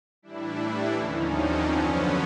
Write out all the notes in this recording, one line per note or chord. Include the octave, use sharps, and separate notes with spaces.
A2 E3 G3 D4 E4
D4 E4
D#2 D3 F3 C#4 D#4
C4 D4
F#2 D3 F3 B3 C#4